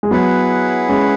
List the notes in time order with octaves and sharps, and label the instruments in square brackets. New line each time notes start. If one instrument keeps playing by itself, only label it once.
[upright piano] G#3
[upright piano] F#3 B3 [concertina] E4 G#4 B4 F#5
[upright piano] G#3 C#4